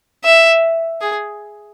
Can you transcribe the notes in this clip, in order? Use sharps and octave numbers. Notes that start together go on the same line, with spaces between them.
E5
G#4